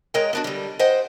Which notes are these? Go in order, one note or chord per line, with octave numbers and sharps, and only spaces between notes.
G#3 A#4 C#5 D#5 G5
B3 D4 F#4
D3 G3
C5 D#5 F#5 G5